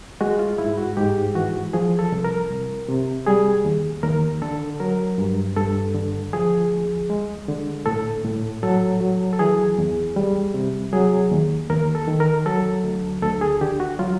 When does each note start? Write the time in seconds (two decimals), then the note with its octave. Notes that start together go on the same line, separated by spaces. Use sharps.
0.21 G#3 F#4
0.39 F4
0.58 G#2 E4
0.78 F#4
0.97 G#2 G4
1.35 E3 F#4
1.73 F3 G#4
1.99 A4
2.12 C2
2.24 A#4
2.50 C2
2.88 C3
3.26 G3 G#4
3.65 D#2
4.03 D#2 A#4
4.42 D3 A4
4.80 F#3 A#4
5.18 G2
5.56 G2 A4
5.95 D3
6.33 F3 G#4
6.72 D2
7.10 G#3
7.48 D3
7.86 A2 A4
8.25 A2
8.63 F#3 A4
9.01 F#3
9.33 A4
9.39 E3 G#4
9.78 E2
10.16 G3
10.54 C3
10.93 F#3 G#4
11.31 D#2
11.70 D#2 A#4
11.95 A4
12.08 D#3
12.20 A#4
12.46 F#3 A4
12.84 D2
13.22 D2 A4
13.41 G#4
13.61 D3 G4
13.80 F#4
13.99 F#3 F4